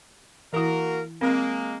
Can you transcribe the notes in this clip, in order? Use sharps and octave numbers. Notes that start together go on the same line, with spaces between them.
E3 A#3 E4 F#4 A#4
G#3 A#3 C4